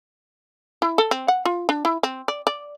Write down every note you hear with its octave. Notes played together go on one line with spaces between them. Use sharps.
E4
A4
C4
F#5
F4
D4
E4
C4
D5
D5